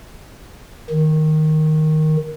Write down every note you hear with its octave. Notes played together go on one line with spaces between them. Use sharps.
D#3